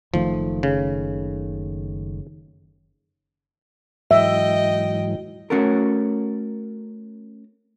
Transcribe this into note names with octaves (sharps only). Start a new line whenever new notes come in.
F#1 D#3 F3 A3
C#3
G#2 E3 F#3 D#5 E5 G5
A3 C#4 F#4 A4 A#4